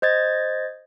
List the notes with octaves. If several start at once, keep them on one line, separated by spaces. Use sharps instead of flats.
C5 D#5 G#6 A6